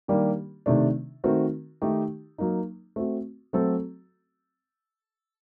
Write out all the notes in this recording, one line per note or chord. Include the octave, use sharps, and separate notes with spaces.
D#3 G3 A#3 D4 G4
C3 D#3 A3 D4
D#3 A3 C4 F#4 A#4
D#3 A3 D#4 G4
F#3 A#3 D#4
A3 C4 F#4
F#3 A3 C4 F#4 A4